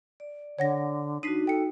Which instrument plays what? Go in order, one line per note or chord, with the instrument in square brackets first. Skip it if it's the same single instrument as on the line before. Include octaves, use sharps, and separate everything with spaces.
[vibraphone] D5
[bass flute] D3 [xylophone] C#5 F#5 A#6
[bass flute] D4 [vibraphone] D#4 F#4 [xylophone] B6 C7 D#7
[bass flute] A4 [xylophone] G5 C#7